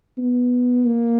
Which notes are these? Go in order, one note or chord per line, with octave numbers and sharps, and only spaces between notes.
B3
A#3